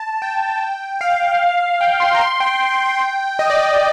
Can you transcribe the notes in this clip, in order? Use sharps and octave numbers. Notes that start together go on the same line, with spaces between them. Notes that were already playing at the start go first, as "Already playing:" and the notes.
Already playing: A5
G5
F5
G5
C6
A#5
C6
G5
D#5
D5
D#5